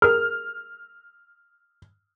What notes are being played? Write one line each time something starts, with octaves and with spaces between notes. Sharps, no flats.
G#4 A#4 F6